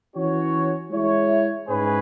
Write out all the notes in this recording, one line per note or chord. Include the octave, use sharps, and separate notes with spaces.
E3 C#4 F#4 C#5
G#3 E4 C#5
G#2 G#3 C#4 G#4 B4